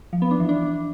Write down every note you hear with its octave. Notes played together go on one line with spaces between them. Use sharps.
F3
B3
D4
E3
D4